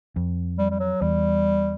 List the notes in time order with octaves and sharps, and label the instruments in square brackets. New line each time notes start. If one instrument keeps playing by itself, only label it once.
[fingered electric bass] F2
[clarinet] G3
G3
F#3
[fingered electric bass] E2 [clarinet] G3